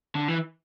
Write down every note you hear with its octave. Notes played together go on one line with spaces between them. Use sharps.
D3
E3